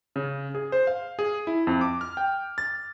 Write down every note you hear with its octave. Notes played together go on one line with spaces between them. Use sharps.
C#3
G#4
C5
F5
G#4
E4
F2
D6
F6
G5
A6